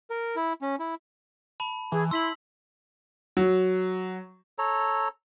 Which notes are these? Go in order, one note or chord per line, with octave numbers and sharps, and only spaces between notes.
A#4
E4
C#4
E4
A5 B5
E3 G#4
E4 C6 E6 B6 F#7
F#3
A4 C#5 A#5